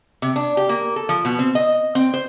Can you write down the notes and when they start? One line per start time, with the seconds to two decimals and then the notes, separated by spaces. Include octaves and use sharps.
0.22 C3
0.36 D4
0.57 G4
0.69 A#3
0.96 A4
1.09 F3
1.25 B2
1.39 C4
1.55 D#5
1.95 C4
2.14 C5